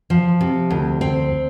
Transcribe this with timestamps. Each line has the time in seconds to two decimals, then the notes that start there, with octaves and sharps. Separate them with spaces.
0.10 F3
0.41 C3
0.70 D2
1.01 C4